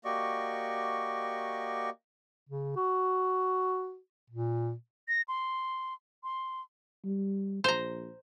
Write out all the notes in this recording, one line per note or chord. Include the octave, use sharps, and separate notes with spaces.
A#3 F#4 G4 D5 D#5 C#6
C#3
F#4
A#2
A#6
C6
C6
G3
A#1 C5 A#5